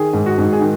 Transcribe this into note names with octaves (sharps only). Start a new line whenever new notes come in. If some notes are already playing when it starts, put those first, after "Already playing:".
Already playing: D#3 G#4
G#2
F#4
G#2
G#4
D#3